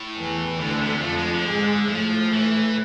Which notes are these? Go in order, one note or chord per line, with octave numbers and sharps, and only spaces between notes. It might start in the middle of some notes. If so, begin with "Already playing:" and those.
Already playing: A2
E2 E3
D2 B2 D3
C3
F2 F3 A3
G#3
D3
G#2 G#3
A2 F3 A3
E3